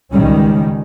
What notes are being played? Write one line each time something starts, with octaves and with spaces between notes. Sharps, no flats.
C#2 D#3 G3 C#4